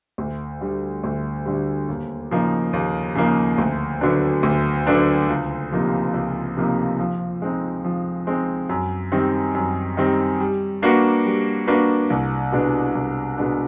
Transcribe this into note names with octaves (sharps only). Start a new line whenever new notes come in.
D2
D3 G3
D2
D3 G3
D#2
C#3 F3 A#3 D#4
D#2
C#3 F3 A#3 D#4
D2
D3 F#3 B3 D4
D2
D3 F#3 B3 D4
C#2
C3 F3 A#3 D#4
C#2
C3 F3 A#3 D#4
F3
G#3 C4 D#4
F3
G#3 C4 D#4
F#2
D#3 G3 C4 D#4
F#2
D#3 G3 C4 D#4
G3
A#3 D4 F#4 B4
G3
A#3 D4 F#4 B4
C2
B2 G#3 B3 D4
C2
B2 G#3 B3 D4